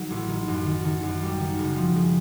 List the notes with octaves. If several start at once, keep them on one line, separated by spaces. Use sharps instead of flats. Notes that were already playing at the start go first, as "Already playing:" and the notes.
Already playing: D#3 F#3
A1
D#3
F#2
D#3
D#3
F#2
G3
D#3
F#1
F3
G#3